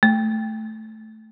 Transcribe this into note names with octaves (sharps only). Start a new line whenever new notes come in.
A3